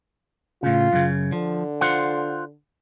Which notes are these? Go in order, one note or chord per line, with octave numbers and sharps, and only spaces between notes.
A2 C#3 F4
F#2 C#3
D3 F3
F4 C5 F#5